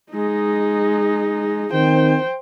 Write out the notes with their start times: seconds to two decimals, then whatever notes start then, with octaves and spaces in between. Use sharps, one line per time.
0.12 G#3 D#4
1.73 D#3 C4 C5 G5